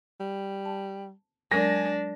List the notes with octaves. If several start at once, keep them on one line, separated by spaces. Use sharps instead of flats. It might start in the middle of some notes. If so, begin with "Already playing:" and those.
G3
A5
F#3 G#3 D4 A#4 G#5 A#6